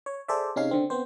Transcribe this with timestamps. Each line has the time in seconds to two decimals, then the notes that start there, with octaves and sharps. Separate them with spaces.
0.06 C#5
0.28 G#4 A4 C5 D5 E5
0.56 C3 C#4 D#4 G#4 F5 C7
0.71 D3 C4
0.90 B3 C4 C5